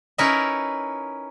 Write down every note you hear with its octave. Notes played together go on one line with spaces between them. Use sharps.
C#4 D#4 E4 A#4 B4 E5